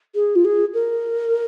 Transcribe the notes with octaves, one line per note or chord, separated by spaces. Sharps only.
G#4
F4
G#4
A#4